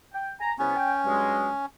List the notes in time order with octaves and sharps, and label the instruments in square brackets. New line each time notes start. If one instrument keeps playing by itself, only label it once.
[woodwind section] G5
G#5 A#5
[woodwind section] C2 B3 [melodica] C#4
[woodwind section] G5
G2 F#3 G#3